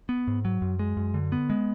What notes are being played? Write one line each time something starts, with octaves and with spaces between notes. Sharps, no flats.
B3
G#2
F#3
F#2
G#3
F#2
D3
B3
G#3